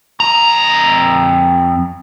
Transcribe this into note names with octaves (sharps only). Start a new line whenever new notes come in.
F2 A#5